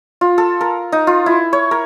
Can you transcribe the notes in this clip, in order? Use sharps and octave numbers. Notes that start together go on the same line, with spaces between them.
F4
A4
A#4
D#4
F4
E4
C#5
A#4